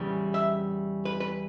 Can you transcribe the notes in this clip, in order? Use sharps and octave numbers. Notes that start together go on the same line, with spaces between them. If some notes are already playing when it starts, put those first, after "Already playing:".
Already playing: E2 C#3 E3 G3
E5
B4
B4